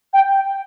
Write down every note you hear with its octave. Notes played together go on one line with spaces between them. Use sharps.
G5